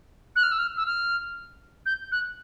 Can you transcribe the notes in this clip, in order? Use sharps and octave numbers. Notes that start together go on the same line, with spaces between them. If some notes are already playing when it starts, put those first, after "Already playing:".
F#6
F6
E6
F6
E6
F6
G6
F#6